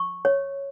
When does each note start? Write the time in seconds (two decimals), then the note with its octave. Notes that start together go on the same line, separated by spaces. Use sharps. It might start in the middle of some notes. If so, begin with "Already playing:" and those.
Already playing: C#6
0.25 C#5